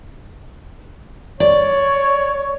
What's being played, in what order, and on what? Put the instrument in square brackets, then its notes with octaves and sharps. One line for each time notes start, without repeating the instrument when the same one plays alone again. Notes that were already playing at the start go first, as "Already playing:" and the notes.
[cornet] C#5 [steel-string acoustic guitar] D5